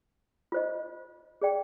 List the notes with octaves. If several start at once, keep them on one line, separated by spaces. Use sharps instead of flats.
F4 C5 D#5
G#4 D5 G5